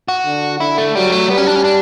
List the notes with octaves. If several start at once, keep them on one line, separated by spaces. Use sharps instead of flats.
F#4
D3
D3 E4
A3
F#3 G3
A3
G3 B3
C#4
D4
C#4
D4